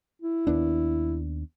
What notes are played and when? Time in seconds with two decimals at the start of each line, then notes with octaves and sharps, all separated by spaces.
0.22 E4
0.47 D#2 B3 D4